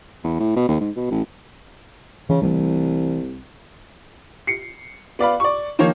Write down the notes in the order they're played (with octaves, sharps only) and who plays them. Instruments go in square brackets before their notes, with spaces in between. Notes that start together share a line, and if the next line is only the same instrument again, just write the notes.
[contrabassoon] E2
A2
B2
D#2
G#2
B2
A1
[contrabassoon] C#3 [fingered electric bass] E3
[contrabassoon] C2 [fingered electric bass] E3 G3 A3
[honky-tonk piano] C7 C#7
B3 D5 F5 B5
D5 C#6
D#3 F3 A#3 C#5